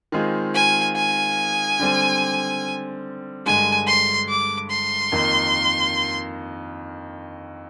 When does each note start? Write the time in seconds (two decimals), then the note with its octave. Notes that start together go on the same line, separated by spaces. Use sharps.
0.12 D#3 G#3 C4 F4 G#4
0.54 G#5
0.96 G#5
1.79 D3 G3 C4
3.46 G2 D3 G#3 G#5
3.87 C6
4.29 D6
4.70 C6
5.12 F2 D#3 A#3